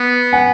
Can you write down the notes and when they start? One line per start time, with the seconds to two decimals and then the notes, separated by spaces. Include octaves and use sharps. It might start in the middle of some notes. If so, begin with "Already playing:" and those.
Already playing: B3
0.33 F#5 G#5